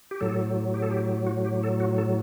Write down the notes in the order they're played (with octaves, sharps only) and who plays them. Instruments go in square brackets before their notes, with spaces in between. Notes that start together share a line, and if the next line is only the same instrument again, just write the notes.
[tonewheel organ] G4
A2 F#3 A4
G4
A4
G4
F#4
G4
A4
F#4
A4